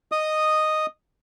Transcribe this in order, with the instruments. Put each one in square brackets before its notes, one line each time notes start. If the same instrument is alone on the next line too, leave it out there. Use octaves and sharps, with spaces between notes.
[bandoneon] D#5 D#6